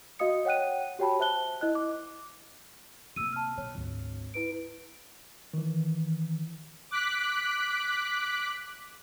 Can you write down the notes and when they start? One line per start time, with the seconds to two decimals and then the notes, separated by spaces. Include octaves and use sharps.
0.19 F#4 D#5 F5 D#6 C#7
0.45 C#5 F#5 G5 F#6 D#7
0.99 F#4 G4 C#5 G5 A5 B5
1.19 C5 E5 A5 F#6 G7
1.61 E4 D#5 F#6
1.75 D6
3.16 C3 A#3 E6 D#7
3.33 A5 F6
3.58 B2 C#5
3.75 G#1 D2
4.34 E4 B4 D7
5.54 D#3 E3
6.91 D6 F#6 B6